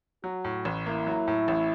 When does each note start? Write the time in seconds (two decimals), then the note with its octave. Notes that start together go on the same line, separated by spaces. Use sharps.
0.24 F#3 F#4
0.45 A2
0.65 A1
0.86 A#3 E4
1.07 F#3
1.28 A2
1.48 A1